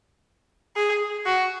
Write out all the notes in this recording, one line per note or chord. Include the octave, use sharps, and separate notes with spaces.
G#4
F#4